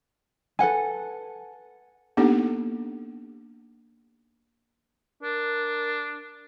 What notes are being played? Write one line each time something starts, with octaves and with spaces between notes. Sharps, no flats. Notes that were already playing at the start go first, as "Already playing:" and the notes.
A4 B4 F#5 G#5
A#3 B3 D4 D#4 G4 A4
D4 A#4